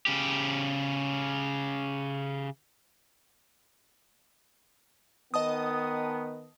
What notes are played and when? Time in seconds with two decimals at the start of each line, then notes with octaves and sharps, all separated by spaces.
0.07 C#3 G4
5.34 D#3 B3 D#5 A5 D#6